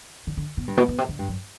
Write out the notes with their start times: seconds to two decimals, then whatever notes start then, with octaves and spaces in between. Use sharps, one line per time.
0.27 D3
0.37 D3
0.57 B2
0.68 G2
0.77 B2
0.88 B2
0.98 C3
1.09 D3
1.19 G2
1.28 F#2